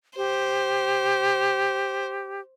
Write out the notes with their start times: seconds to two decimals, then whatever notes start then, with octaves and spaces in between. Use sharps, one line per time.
0.17 G4 C5